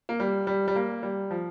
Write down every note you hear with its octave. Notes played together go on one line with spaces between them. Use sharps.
A#3
G3
G3
G3
A#3
G3
F3